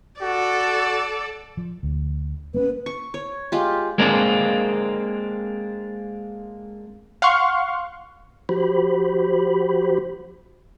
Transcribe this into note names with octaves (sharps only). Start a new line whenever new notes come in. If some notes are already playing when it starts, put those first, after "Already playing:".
F#4 A4 D5
F3
D2
A#3 B3 C#4 B4
C#6
C#5
G#3 F4 G4
G#3 A#3 C4 D4
F5 F#5 C6 C#6
F3 F#4 G4 C5 B5